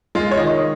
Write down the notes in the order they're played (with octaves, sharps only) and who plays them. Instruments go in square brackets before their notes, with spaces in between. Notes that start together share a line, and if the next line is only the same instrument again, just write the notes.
[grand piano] G#3 F4
C#5
D#3 D#5